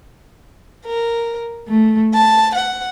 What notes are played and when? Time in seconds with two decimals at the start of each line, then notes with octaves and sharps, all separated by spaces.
0.85 A#4
1.67 A3
2.14 A5
2.54 F#5